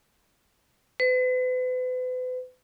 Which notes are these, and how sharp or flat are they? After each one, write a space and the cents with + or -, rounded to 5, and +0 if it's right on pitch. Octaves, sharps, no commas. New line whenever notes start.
B4 +40